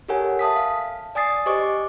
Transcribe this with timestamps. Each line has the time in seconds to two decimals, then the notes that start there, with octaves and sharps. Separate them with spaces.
0.09 G4 A4 A#4 C#5 F#5 G#5
0.39 E5 A5 D#6 B6
0.56 F5
1.15 D5 G#5 D#6 A6 C7
1.46 G4 C5 D#5 G#5 C#6 D6